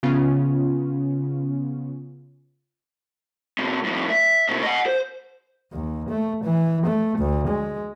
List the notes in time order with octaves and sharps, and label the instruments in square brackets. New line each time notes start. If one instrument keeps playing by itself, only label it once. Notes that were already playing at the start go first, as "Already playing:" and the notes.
[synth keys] C#3 B3 C#4 F4
[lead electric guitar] A2 C3
F2 A2
E5
A2 C3
D#5 F#5
C5
[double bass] D#2
A3
E3
A3
D2
G#3